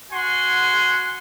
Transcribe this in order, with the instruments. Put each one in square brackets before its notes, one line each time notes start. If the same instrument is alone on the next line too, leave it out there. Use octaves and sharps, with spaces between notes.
[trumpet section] F#4 F#5 G#5 C6